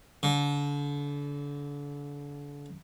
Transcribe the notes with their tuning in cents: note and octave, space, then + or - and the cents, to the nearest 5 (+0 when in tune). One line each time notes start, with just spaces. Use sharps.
D3 -35